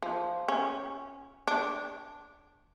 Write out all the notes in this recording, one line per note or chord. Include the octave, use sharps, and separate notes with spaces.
F3
C#4
D4